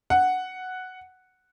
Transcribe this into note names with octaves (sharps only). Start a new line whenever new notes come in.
F#5